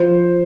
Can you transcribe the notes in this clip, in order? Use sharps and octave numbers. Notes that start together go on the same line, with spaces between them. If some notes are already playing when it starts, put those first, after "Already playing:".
Already playing: F3 C5